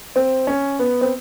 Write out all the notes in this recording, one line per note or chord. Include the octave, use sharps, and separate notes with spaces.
C4
C#4
B3
C4